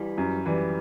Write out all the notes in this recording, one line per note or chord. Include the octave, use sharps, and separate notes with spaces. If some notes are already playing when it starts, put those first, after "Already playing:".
Already playing: E3 G3
F#2
E3 G3